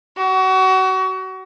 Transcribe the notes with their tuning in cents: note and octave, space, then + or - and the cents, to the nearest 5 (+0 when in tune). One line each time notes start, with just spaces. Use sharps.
F#4 +30